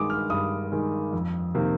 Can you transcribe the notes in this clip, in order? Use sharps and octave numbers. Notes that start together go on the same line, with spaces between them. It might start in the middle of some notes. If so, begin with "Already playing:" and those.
Already playing: G2 D#3 G#3 D6 D#6
F6
G2 D#6
D#3 G#3
F2
C3 D#3 A#3